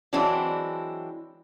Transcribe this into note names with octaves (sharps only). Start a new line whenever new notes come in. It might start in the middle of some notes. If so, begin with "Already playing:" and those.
E3 F#3 G#3 C4 D4 E4